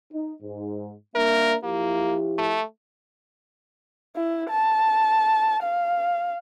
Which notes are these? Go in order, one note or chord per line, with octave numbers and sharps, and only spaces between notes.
D#4
G#2
A#3 D4 A#4 E5
F3 A#3 E4 G4
A3
E4
A5
F5